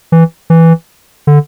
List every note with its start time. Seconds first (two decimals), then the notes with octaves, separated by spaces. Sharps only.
0.12 E3
0.50 E3
1.27 D3